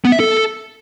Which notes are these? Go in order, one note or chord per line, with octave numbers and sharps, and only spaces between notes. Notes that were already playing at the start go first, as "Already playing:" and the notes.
B3
E5
A4